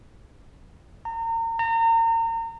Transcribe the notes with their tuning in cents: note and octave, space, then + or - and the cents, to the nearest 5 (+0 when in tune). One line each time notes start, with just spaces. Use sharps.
A#5 -35
A#5 -35